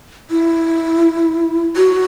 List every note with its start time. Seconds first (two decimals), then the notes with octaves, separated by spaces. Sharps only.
0.31 E4
1.76 F#4